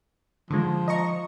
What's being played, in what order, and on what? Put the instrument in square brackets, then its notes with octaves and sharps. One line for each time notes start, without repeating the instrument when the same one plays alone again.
[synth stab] D3 D#3 G#3 [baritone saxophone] F3
[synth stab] D#5 A#5 C#6